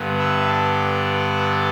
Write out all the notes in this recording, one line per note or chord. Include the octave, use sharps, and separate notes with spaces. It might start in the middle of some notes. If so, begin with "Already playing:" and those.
Already playing: G2 D3 B3
B4 E5
A4 D5